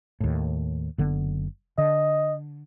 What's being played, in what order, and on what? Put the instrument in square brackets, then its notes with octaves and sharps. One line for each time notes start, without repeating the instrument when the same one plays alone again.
[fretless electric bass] D#2 A2
F#1 D3 B3
[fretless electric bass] D3 [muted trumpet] D#5